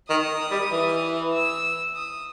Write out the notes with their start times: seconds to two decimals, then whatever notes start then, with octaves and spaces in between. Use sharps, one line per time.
0.10 D#3 D#6
0.51 G3
0.72 E3
1.34 E6
1.95 D#6